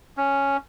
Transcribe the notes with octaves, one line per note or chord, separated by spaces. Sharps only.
C#4